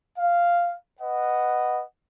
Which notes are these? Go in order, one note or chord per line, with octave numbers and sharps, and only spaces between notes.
F5
B4 D#5 F#5